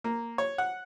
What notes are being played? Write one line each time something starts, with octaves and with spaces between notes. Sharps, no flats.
A#3
C#5
F#5